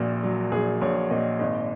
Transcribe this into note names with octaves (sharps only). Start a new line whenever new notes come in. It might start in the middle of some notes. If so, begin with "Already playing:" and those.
Already playing: A#1 A#2 F#4
F#3
A#1 G#4
A#1 C#5
A#2 D#5
G#1 D#5